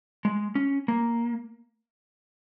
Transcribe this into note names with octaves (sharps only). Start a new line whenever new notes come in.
G#3
C#4
A#3